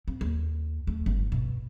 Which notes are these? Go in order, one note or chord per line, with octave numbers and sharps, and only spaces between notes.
C4
D#2
A3
G1
B2